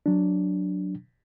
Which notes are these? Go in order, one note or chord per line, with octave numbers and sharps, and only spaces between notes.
F#3 D4